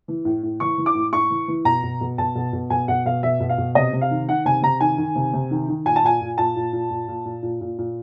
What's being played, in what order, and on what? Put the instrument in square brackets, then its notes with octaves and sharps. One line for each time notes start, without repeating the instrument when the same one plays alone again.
[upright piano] E3
A2
A2
E3 C#6
E3
D6
A2
A2 C#6
E3
E3
B2 A#5
B2
B2
B2 A5
B2
B2
B2 G#5
B2 F#5
B2 F5
B2 E5
B2
F5
B2
C3 D#5
C3
F5
D#3
D#3 F#5
C3 G#5
C3 A#5
D#3 G#5
D#3
C3
C3
D#3
D#3
A#2 G#5
A5
A#2 G#5
A#2
A#2 A5
A#2
A#2
A#2
A#2
A#2
A#2
A#2
A#2